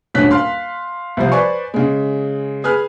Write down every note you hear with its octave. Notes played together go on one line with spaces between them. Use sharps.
D#1 D2 G2 C#4 F#6 B6
F5 C6 F6
C2 F3 C5
B4 C5 D5 G#5 C#6
C#3 G#3
G#4 B4 G#5 F6